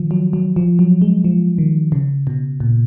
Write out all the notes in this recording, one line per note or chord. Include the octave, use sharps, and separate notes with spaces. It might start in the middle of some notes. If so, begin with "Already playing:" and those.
Already playing: D#3 F3
F#3
F#3
F3
F#3
G#3
F3
D#3
C#3
B2
A#2